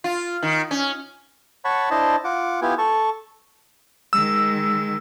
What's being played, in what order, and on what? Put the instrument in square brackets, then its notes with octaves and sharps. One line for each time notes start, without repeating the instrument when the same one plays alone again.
[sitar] F4
D#3
C#4
[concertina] C#5 F#5 A5 B5 C#6
D4 E4 C5 D#5 A5
F4 F#5 D6
B3 E4 F4 G4 G#5
A4 A5 C#6
[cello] D#3 G#3 [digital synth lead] E6